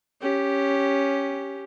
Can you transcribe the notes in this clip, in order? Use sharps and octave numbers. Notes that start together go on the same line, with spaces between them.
C#4 G4